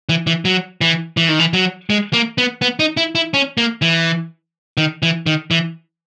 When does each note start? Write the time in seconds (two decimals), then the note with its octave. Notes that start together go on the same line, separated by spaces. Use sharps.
0.09 E3
0.27 E3
0.45 F#3
0.81 E3
1.17 E3
1.29 D#3
1.40 E3
1.53 F#3
1.90 G#3
2.13 A#3
2.38 B3
2.62 B3
2.79 D#4
2.97 E4
3.15 E4
3.34 C#4
3.58 A#3
3.82 E3
4.77 D#3
5.03 E3
5.26 D#3
5.51 E3